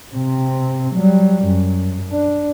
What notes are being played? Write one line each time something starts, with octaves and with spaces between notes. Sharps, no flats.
C3 C4
F#3 G3
F#2
D4